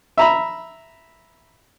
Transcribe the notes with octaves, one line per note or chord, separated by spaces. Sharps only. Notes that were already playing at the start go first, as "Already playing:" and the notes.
E5 A#5 B5